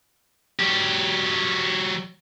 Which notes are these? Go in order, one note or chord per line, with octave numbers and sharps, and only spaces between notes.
F#3 G4